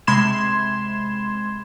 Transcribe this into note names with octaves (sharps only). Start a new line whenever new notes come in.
C3 G#3 B5 C6 G#6 E7